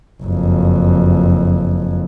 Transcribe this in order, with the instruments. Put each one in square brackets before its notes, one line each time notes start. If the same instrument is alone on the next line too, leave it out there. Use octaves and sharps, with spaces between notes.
[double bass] F#1 F2